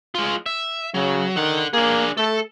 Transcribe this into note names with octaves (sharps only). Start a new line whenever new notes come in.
G#3 F4
E5
C#3 F#3
D3 D#3 F#5
A#3 D4 G#4
A3 A4